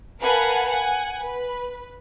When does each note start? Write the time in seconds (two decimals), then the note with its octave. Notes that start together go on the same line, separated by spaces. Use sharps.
0.22 A#4 B4 F5 F#5 G#5 A5
0.69 F#5 G#5
1.20 B4